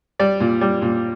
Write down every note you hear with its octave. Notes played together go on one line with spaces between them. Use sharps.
G3 D5
A#2
G3
A#2